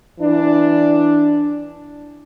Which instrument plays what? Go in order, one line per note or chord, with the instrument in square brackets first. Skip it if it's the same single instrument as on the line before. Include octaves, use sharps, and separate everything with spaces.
[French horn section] E3 D4